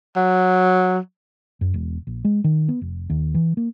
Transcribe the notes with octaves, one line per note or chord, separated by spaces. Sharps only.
F#3
F#2
E1
A#1
G#3
D#3
B3
F1
D#2
E3
A#3